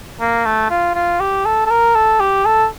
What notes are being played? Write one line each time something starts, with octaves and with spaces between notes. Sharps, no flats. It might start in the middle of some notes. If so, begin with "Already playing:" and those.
A#3
A3
F4
F4
G4
A4
A4
A#4
A4
G4
A4